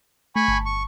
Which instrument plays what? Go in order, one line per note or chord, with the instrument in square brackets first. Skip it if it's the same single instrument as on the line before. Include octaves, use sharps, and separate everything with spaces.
[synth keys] A3 [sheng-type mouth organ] G#5 B5 C#6
[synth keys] G1 A5
[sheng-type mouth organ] C#6